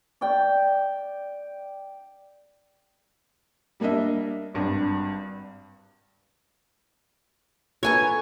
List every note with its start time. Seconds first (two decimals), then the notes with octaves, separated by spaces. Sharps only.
0.21 D5 G5
3.80 G3 A#3 D4 D#5 E5
4.54 G#1 G2 D4
7.83 A4 B4 C#5 G#5 A#5 C#6 G#6